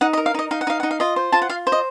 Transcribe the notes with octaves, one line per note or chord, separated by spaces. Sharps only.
D#4 F#5
D#5
A#4
F5
D#4 D#5
D#4 F5
F#5
D#4 F5
D#4 F#5
F5
F4 D#5
C5
F4 A5
F#5
F4 F5
C5
D#5